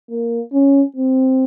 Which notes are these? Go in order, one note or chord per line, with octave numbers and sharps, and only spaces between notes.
A#3
C#4
C4